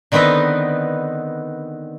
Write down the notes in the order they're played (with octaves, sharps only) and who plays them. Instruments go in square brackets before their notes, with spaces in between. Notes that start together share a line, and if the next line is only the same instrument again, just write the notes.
[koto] D3 D#3 B3 C4 D#4 B4